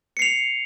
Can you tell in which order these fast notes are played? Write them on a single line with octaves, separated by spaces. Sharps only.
C#7 C7 F7